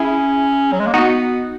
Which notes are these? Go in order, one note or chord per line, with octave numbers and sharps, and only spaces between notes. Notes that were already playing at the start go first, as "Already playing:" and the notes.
Already playing: C#4 E4 G#4
F#3
G#3
A#3
B3 D#4 F#4